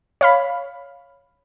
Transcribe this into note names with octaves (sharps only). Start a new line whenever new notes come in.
C#5 F5 B5